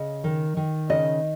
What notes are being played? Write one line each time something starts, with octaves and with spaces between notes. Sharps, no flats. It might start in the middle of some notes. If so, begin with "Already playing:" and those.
Already playing: C#3 D#5
D#3
D#3
C#3 D#5